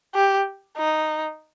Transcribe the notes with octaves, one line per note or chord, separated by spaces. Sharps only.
G4
D#4